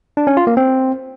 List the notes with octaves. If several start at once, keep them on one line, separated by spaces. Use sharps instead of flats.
D4
C#4
F4
A#3
C4